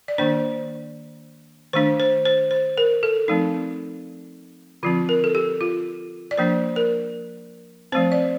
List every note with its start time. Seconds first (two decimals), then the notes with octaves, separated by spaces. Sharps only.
0.08 D5
0.18 D#3 A#3 D4 C5
1.73 D#3 A3 D4 C5
2.00 C5
2.26 C5
2.51 C5
2.78 A#4
3.03 A4
3.28 F3 A3 C4 D#4
4.83 D3 F3 C4 F4
5.09 A#4
5.24 A4
5.35 G4
5.61 F4
6.31 D5
6.38 F3 A#3 D4 C5
6.76 A#4
7.92 F3 A3 C4 C5
8.12 D5